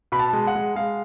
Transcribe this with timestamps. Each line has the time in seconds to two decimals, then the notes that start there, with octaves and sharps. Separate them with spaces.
0.12 B2 B5
0.19 A5
0.33 G#3
0.47 F#5
0.55 G#3
0.76 G#3 F5